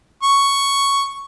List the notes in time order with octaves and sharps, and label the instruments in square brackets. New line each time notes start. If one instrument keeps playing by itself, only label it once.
[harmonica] C#6